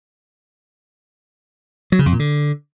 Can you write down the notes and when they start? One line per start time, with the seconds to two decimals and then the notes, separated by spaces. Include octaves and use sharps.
1.92 F#3
1.99 C#3
2.06 F2
2.13 A#2
2.19 D3